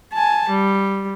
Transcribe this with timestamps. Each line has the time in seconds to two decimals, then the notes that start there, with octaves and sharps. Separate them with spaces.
0.13 G#5 A5
0.50 G3